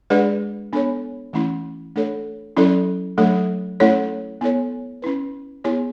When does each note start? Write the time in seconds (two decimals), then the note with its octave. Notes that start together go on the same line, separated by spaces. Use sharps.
0.10 G#3 D4 G#4 B4 D5
0.73 B3 D4 A4 C#5
1.33 E3 A3 C#4 E4
1.96 A3 D4 A4 C#5
2.57 F#3 C#4 E4 A4 D5
3.18 F#3 A3 D4 A4 C#5
3.80 A3 C#4 E4 A4 C#5
4.41 B3 E4 A4 C#5
5.02 C#4 E4 B4
5.64 B3 E4 G#4 C#5